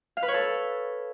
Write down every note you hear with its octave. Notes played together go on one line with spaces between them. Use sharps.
F5
B4
C#5
A4